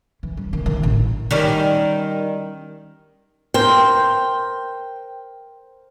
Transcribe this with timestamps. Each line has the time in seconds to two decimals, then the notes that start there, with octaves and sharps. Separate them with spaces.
0.23 E3
0.37 G3
0.53 D#3
0.66 D#3
0.83 A1
1.31 D#3 G3 C#4
3.54 A#4 C5 G5